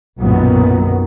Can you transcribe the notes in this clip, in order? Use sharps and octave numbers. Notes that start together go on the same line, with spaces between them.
B1 F#2 A#2 D#3 F#3 B3